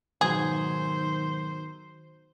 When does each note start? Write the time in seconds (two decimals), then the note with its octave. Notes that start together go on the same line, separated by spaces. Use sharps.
0.21 G#2 B2 D#3 F#3 G#4 C5